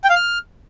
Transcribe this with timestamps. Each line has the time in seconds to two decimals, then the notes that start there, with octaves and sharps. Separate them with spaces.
0.04 G5
0.10 F5
0.16 F6